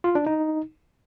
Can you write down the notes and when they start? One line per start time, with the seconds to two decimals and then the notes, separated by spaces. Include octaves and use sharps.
0.04 F4
0.15 D4
0.26 D#4